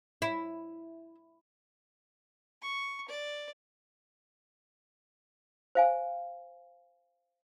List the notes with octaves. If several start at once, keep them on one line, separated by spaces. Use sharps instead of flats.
E4
C#6
D5
C5 F5 G#5